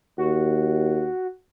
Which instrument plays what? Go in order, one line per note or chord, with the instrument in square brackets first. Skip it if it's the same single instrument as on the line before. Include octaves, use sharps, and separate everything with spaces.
[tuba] D#2 [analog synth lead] F#4